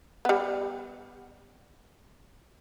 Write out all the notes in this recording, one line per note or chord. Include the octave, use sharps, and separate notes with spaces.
G3 B3